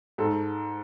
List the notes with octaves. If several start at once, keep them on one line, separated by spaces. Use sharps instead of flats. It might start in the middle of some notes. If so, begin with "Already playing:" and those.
G#2 A4